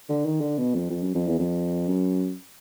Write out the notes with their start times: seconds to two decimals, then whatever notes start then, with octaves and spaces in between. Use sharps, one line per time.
0.09 D3
0.25 D#3
0.41 D3
0.58 B2
0.74 F2
0.90 F2
1.02 F#2
1.15 F2
1.27 E2
1.39 F2
1.88 F#2